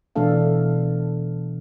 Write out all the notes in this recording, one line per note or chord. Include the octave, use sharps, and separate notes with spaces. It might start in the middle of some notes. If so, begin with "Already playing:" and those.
B2 E3 A3 D4 A4 F5